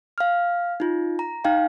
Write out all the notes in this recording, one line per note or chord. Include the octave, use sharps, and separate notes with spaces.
F5 F6
D#4 F4
A#5
D#4 F5 G5